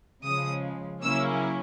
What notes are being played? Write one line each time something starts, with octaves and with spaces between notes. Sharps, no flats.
C#3 F3 G#3 D#6
C#3 F#3 A#3 C#4 E4 E6